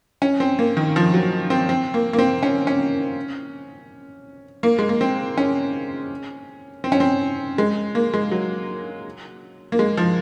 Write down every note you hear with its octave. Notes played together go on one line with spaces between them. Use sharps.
C#4
C4
A#3
D#3
F3
F#3
C4
C4
A#3
A#3
C4
C#4
C#4
A#3
G#3
A#3
C4
C#4
C4
C#4
C4
G#3
A#3
G#3
F#3
A#3
G#3
F3